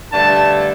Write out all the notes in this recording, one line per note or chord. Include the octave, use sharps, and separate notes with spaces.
G2 D3 A3 A5